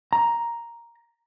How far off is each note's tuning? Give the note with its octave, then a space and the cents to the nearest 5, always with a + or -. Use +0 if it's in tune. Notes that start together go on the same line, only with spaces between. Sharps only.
A#5 +5